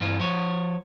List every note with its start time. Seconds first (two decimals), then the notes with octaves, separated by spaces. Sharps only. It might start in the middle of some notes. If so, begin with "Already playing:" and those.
0.01 G2 E3 F4
0.20 F3 C#5